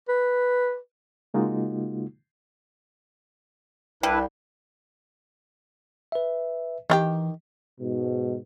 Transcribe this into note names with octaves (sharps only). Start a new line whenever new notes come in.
B4
C#3 G#3 A#3 D#4 F4 F#4
C2 G3 D4 E4 B4
B4 E5
D#3 E3 F4 G4
G#2 B2